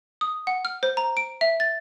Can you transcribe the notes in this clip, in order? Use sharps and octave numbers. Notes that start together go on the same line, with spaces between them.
D#6
F#5
F6
C5
A#5
D7
E5
A6